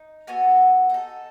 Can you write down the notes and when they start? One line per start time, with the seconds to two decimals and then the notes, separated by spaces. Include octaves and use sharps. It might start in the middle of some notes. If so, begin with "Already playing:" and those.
Already playing: D#4
0.27 B3 F#4 A4 G#5
0.90 D#4 A4